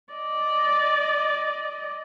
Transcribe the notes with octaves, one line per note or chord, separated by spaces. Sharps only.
D5 D#5